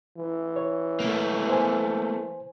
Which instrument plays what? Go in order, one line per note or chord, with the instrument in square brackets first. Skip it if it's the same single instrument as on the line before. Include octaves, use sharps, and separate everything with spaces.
[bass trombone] E3
[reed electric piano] C#5
[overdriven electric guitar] A3 A#3
[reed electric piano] C5 G#5